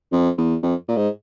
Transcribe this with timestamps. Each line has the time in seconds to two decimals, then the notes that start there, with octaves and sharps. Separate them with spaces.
0.12 F2
0.38 E2
0.63 F2
0.88 A#2
0.97 G#2